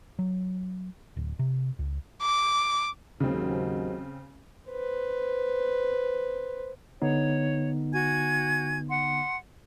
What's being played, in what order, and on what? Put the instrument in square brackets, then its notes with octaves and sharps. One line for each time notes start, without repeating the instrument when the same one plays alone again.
[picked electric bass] F#3
D1
C3
C#2
[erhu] D6
[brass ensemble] D#2 G#2 F#3 [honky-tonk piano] C#3 C4
[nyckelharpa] B4 C5
[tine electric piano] D3 B3 D#4 [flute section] C#5
[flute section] F#4 G#5 G#6
F#5 C6